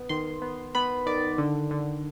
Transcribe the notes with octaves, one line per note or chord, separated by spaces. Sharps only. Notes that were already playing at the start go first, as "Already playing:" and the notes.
Already playing: B3
D#3 C6
B3
B3 B5
D#3 D5
D3
D3